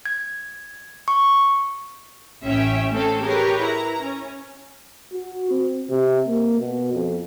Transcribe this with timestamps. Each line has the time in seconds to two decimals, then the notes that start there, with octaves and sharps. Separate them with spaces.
0.06 G#6
1.08 C#6
2.45 A1 C#4 E5 G5
2.90 A3 C4 C#4 A4
3.22 G4 G#4 A#4 B4 C#5
3.60 E4 A#5
4.01 C#4
5.13 F#4
5.51 C4
5.90 C3
6.28 A#3
6.59 B2
6.93 F2